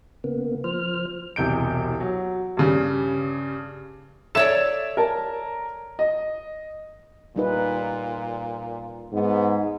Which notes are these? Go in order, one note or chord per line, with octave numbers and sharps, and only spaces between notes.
C#3 A#3 B3
F3 C5 F6
E1 C2 G6 D7
F#3
G2 C#3 G3
A4 C#5 D5 E5 E7
A#4 A5
D#5
A#2 G3 D#4 B4
G#2 B3